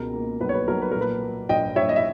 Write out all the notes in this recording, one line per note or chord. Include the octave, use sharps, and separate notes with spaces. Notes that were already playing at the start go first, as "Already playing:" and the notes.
Already playing: C#2 B2 A#4
A#3
B1 B4
C#5
B4
B1 A#4
B4
A#2 A#4
B4
A#3
A#1 D#5 G5
A#1 C#5 E5
D#5
E5